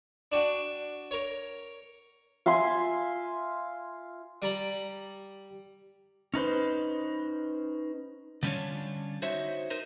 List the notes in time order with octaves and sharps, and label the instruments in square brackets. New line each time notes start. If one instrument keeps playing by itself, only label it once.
[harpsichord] D4 F#4 G5
A#4 C#5
[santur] F4 E5 G#5 C6
[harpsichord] G3 D5 A#5 B5
[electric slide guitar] C#4 D#4 B4 C5
[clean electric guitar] D3 G3 C#4 D4 F4 C#5
D#4 F#4 C5 C#5 E5
D#4 A#4 C5